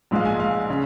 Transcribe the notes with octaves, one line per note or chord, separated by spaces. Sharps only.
A#1 G#2 G#3 F5
G#5
F5
C#3